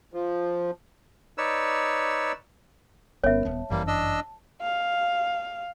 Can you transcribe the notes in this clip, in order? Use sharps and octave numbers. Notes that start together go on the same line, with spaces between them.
F3
D#4 B4 C#5 D5 E6
G1 B3 C#4 A#4 C#5 E5
D#1 B3 A5
G1 F#2 E3 G3 A#3
D4 D#5 E6
F5